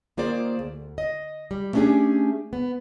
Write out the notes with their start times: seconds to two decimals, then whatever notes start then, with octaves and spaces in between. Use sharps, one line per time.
0.17 D#3 A#3 F4 G#4 C5 D5
0.59 D2
0.98 D#5
1.51 G3
1.73 A3 B3 C#4 D4 G4 G#4
2.53 B3